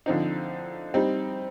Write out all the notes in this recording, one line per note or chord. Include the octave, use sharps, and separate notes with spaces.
D3 F3 C4 D#4
G3 C4 D#4